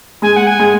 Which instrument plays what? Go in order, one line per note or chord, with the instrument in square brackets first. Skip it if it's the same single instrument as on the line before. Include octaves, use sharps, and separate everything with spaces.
[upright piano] G#3 [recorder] G#5
[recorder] F#5
G#5
[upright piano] G#3